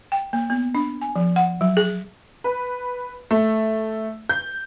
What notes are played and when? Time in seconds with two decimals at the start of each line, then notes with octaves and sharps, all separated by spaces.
0.12 G5
0.33 A#3
0.50 B3
0.75 D4
1.01 G#5
1.16 F3
1.36 F#5
1.61 F#3
1.77 G#4
2.44 B4
3.31 A3
4.29 G6